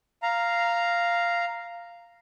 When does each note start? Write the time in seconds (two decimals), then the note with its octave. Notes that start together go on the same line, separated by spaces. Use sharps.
0.23 F5 A#5